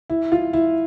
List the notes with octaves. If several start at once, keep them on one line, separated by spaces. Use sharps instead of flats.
E4
F4
E4